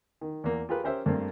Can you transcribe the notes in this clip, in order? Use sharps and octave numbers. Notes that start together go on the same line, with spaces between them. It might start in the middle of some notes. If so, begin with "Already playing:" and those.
D#3
E2 A#3
F4 G4 G#4 A#4 B4
C#4 G4 A#4 C5 E5
G2 A3 A#3 C4